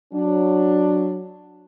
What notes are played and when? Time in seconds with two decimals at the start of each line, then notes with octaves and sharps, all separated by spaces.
0.14 F#3 D4